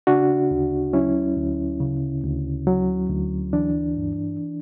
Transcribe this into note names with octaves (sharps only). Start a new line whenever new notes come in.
C#3 D4 F#4
D2
F#3 C#4 E4
D2
C#3
D2
F#3
D2
E3 D4
G2